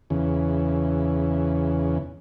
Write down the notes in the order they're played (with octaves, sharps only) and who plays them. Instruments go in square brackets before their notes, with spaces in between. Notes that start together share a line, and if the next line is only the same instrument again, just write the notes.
[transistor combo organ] E2 C#3